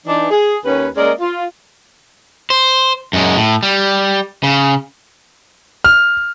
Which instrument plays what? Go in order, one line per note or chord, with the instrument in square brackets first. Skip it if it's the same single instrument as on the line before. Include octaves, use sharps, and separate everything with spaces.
[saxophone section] E3 D4 D#4
G#4
D#2 C#4 B4
G#3 A#3 C#4 A#4 D5 D#5
F4
[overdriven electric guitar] C5
F#2 G#3
A2
G3
C#3
[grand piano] F6